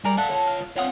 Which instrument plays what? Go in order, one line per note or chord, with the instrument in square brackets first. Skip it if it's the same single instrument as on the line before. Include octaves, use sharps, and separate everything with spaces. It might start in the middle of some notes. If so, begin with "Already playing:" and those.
[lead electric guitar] G3 [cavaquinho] G#4 A#4 D5
[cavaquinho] A4 F#5 [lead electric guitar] D5 F5
[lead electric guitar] F4 C#5
[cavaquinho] F5
[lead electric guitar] C4 C#5 [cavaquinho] F4 F#5 D#6